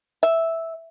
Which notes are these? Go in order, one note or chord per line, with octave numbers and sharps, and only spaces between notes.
E5